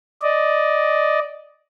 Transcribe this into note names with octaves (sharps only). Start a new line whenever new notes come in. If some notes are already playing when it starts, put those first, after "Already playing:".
D5 D#5